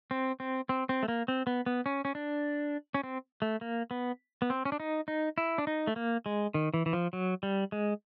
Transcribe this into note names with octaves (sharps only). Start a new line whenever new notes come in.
C4
C4
C4
C4
A3
A#3
C4
B3
B3
C#4
C#4
D4
C#4
C4
A3
A#3
B3
B3
C4
C#4
D4
D#4
D#4
E4
D4
D#4
A3
A#3
G#3
D#3
E3
E3
F3
F#3
G3
G#3